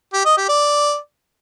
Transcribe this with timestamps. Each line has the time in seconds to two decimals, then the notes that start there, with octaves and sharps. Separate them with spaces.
0.13 G4
0.25 D#5
0.37 G4
0.49 D5